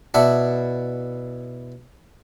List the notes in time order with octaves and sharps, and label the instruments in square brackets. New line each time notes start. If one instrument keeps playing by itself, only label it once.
[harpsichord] B2 E4 D5 F#5 A5